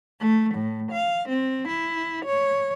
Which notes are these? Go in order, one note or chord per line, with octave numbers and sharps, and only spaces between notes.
A3
A2
F5
C4
E4
C#5